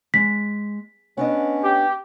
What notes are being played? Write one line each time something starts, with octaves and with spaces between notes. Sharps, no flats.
G#3 B6
B3 C#4 D4 D#5
G4